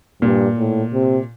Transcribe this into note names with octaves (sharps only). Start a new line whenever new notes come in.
G2 A#2
A2
C3